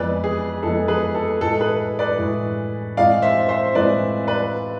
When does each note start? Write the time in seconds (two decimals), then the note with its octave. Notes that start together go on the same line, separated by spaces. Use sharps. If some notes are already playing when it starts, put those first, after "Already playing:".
Already playing: F2 E3 G#3 B3 B4 D5
0.24 G#4
0.63 F2 E3 G#3 B3 A4
0.88 G#4 B4
1.15 A4
1.41 A2 E3 G#3 A4
1.60 G#4 B4
1.99 B4 D5
2.18 A2 E3 G#3
2.97 A2 E3 G#3 C4 D5 F5
3.22 C5 E5
3.49 C5 E5
3.75 A2 E3 G#3 C4 B4 D5
4.27 B4 D5